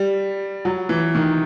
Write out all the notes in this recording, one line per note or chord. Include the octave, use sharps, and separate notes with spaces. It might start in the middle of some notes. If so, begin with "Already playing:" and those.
Already playing: G3
F#3
E3
D#3